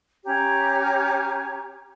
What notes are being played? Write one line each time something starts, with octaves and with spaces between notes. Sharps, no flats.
C#4 G4 C#5 A#5